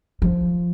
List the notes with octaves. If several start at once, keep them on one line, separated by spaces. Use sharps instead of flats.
F3